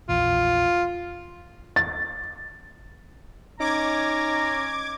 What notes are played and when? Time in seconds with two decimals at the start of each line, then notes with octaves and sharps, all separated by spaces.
0.09 A#1 E2 F4
1.76 A6
3.60 C#4 D#4 A#5 D6 G#6